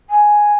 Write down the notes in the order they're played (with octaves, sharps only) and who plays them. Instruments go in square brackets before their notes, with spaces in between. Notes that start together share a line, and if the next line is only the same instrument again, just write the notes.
[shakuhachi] G#5